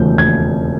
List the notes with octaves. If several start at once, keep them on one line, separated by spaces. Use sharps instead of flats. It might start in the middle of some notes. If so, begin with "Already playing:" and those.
Already playing: E1 D#2 C#3 F3 A3 G6
G#6